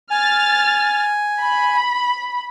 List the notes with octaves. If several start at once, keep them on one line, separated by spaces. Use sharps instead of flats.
G#5 F6 A6
B5